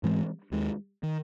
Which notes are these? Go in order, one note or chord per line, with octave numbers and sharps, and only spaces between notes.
G#2 E3 G#3 C4
D#2 D#3 G#3
D#3